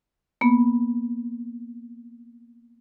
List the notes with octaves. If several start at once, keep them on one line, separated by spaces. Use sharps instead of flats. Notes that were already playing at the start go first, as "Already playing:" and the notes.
A#3 B3